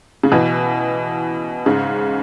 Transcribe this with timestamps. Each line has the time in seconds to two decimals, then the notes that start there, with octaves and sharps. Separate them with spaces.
0.23 C#3
0.32 B2 E3
1.66 G#2 C#3